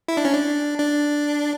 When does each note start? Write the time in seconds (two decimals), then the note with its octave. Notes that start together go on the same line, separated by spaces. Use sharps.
0.08 E4
0.17 D4
0.25 C#4
0.34 D4
0.78 D4